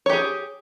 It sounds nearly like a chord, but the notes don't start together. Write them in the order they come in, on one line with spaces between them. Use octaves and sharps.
C#5 G4 G#4